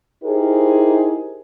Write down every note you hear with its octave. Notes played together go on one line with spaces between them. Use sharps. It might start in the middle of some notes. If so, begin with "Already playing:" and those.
D#4 E4 G4 G#4 A#4 C5